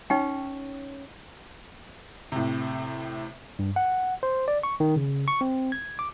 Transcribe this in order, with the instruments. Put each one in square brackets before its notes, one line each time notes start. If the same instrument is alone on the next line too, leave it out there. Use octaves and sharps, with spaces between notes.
[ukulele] C#4 [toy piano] D#4 G5
[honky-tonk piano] A2 C3
[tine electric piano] G2
F#5
C5
D5
C#6
D#3
C#3
C#6
C4
G#6
D6